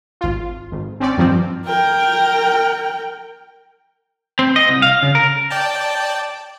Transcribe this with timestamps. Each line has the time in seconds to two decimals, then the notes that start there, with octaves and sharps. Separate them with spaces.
0.21 G#1 F4
0.72 G#1
1.00 C4 C#4 D5
1.17 G2 D#3 F3 C4
1.65 A#4 G5
4.39 C4
4.56 D#5
4.69 C2
4.82 F5
5.03 C#3
5.15 A#4
5.50 D5 G5 A5